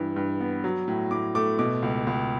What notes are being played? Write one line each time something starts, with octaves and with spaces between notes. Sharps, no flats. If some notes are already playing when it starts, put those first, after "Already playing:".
Already playing: G2 E3
G2
B3
F#3
A2
A2 D6
A3 D6
B2 D6
C#2
C#2